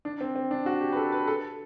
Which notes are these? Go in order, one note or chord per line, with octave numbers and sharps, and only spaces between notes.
D4
C4
C4
D4
F#4
G4
B4
A4
B4
A4